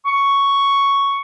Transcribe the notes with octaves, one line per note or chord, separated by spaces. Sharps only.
C#6